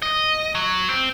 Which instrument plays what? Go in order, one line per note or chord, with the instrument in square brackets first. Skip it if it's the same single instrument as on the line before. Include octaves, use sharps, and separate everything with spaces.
[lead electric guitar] D#5
F#3
C4